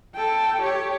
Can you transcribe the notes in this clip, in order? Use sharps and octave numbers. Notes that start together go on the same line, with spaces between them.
A4 G5
G4 C#5